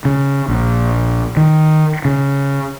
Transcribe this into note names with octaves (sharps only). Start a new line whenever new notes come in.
C#3
A#1
D#3
C#3